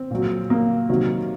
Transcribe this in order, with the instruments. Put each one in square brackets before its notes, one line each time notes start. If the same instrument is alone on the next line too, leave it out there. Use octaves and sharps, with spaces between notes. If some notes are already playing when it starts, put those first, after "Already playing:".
Already playing: [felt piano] C4
A#2 F#3
A#3
C3 D#3 F#3